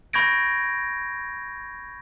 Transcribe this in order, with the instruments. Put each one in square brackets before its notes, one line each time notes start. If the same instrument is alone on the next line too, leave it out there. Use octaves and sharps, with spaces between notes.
[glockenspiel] B5 C#6 G6 G#6 A#6 D7